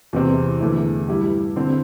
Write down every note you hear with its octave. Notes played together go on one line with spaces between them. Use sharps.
E2 C3 E3 C4
E2 D3 A3 E4
G2 G3 E4 G4
D3 C4 E4